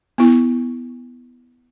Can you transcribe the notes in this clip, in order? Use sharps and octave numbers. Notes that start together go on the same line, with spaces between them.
B3 E4